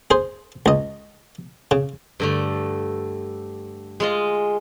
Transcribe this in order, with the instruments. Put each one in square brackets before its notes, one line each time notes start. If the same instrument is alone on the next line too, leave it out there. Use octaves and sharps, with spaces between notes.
[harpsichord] G#4 C5
C#2 D#5
C#3
[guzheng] G2 D3 A3
G#3 F4 D#5